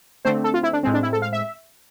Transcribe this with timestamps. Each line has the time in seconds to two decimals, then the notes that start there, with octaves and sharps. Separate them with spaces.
0.25 D3 A3 C4 C5
0.44 A4
0.54 F4
0.63 E4
0.73 D4
0.83 A2 G#3 C4
0.94 D4
1.03 E4
1.13 A4
1.22 F5
1.33 E5